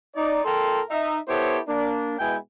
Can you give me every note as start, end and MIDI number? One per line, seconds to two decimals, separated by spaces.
0.15 0.44 63
0.15 0.44 74
0.45 0.80 46
0.45 0.80 69
0.45 0.80 70
0.45 0.80 79
0.45 0.80 84
0.90 1.18 63
0.90 1.18 76
1.28 1.59 59
1.28 1.59 64
1.28 1.59 67
1.28 1.59 69
1.28 1.59 72
1.28 1.59 73
1.68 2.17 58
1.68 2.17 62
2.19 2.36 47
2.19 2.36 56
2.19 2.36 59
2.19 2.36 64
2.19 2.36 79
2.19 2.36 80